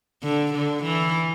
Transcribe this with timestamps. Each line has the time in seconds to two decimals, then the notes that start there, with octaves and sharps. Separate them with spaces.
0.23 D3
0.53 D3
0.83 E3